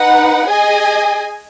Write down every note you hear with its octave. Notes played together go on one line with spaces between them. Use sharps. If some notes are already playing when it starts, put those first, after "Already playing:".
Already playing: D#4 B4 F#5
G#4 D#5 G#5